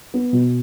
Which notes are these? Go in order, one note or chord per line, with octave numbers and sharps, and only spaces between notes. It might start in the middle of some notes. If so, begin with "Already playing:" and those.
B3
B2